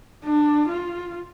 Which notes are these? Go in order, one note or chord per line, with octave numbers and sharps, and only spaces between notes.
D4
F4